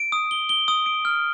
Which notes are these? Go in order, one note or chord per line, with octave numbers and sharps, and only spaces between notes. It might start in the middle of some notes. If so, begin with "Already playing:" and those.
Already playing: D7
D#6
G7
G7
D#6
D7
F6